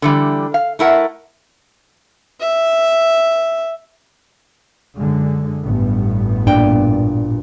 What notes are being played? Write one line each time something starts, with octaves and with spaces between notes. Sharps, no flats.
D3 E3 G3
F5
A3 E4 A#4 F#5
E5
F#2 D3 G#3
A1 G2 B3
A#2 D4 G5